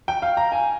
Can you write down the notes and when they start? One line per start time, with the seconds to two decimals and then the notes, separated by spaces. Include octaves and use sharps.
0.08 G5
0.22 F5
0.37 A#5
0.52 G#5